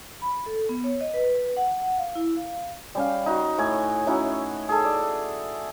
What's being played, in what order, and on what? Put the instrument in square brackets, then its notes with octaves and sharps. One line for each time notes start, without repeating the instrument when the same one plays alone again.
[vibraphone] B5
A4
B3
C#5
D#5
B4
F#5
F5
E4
F5
[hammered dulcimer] G3 C#4 F5
D#4 F#4
A2 G#5
C#4 D#4 E4 F#4
G#4 A4
D5